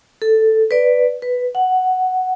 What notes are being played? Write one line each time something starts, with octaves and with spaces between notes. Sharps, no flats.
A4
B4 D5
B4
F#5